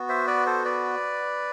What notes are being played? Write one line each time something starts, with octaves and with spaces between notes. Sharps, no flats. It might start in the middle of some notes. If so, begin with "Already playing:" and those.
Already playing: B3 F#4
C5 E5
B4 D5
A4 C5
B4 D5